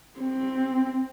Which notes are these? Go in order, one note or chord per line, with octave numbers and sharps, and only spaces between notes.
C4